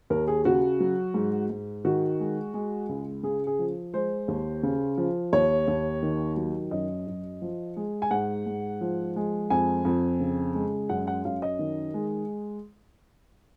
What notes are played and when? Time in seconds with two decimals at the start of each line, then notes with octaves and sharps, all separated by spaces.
0.10 D#2 A#4
0.28 G#4
0.45 C#3 F#4
0.80 F#3
1.14 G#2
1.50 G#2
1.85 D#3 F#4
2.20 G#3
2.54 G#3
2.89 C#2
3.23 C#3 G#4
3.47 G#4
3.59 F3
3.94 G#3 C5
4.28 D#2
4.63 C#3
4.98 F3
5.33 D#2 C#5
5.68 D#2
6.03 D#3
6.37 F#3
6.71 F#2 D#5
7.07 F#2
7.42 F3
7.77 G#3
8.02 G#5
8.11 G#2 F#5
8.47 G#2
8.81 F3
9.16 G#3
9.50 F2 G#5
9.85 F2
10.20 C#3
10.55 G#3
10.89 F#2 F#5
11.07 F#5
11.25 F#2 F5
11.42 D#5
11.59 D#3
11.94 G#3